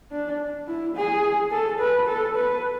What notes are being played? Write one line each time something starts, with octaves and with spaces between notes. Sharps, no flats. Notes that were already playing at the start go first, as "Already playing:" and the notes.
D4
E4
G#4
A4
B4
A4
B4